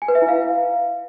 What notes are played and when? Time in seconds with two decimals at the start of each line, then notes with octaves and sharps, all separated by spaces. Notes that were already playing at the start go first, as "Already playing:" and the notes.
0.02 G#5
0.08 B4
0.15 E5
0.22 E4
0.28 F5